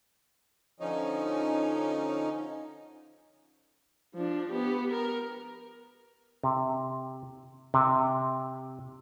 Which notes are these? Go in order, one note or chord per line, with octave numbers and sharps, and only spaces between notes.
D3 F3 C#4 D#4
F3 D4
B3 G4
A#4
C3
C3